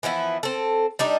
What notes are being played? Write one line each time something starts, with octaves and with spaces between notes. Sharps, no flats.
E3 F3 B3 E4
C4 A4
G3 D4 D#4